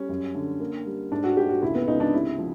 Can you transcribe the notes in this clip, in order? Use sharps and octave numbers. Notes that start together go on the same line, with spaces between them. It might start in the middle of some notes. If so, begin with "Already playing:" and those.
Already playing: G3 C#4
F#2
D3
A#3
G3
G#2 D4
F#4
G#2 G4
F#4
C#2 E4
B3
C#2 D#4
D4
C3 E4
F3